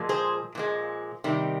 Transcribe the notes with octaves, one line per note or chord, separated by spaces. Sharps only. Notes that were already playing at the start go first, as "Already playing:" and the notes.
Already playing: A#2 F3 G#3
G#4 C5
A#2 F3 G#3
C3 D#3 G3